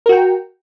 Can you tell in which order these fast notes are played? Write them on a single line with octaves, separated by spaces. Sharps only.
A#4 F#4 G5